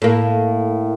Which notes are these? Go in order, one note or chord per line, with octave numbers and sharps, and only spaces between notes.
A2 A#3